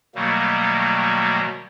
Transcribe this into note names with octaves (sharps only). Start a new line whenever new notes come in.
B2 D#3 F#3 G3 A3 A#3